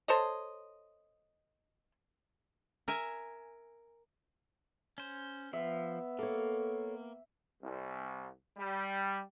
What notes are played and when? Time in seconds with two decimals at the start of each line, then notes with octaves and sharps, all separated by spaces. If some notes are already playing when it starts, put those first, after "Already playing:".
0.08 A4 C5 C#5 D#5
2.88 A#4 E5 G#5
4.98 C#4 C5
5.53 F3 B3 E5
6.19 A#3 A4 C#5
7.62 C2
8.57 G3